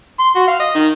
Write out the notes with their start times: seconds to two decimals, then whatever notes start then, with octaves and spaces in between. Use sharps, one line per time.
0.19 C6
0.36 F#4
0.48 F5
0.60 D#5
0.75 D#3